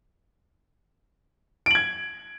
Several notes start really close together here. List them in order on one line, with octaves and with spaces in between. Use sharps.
D7 F#7 G#6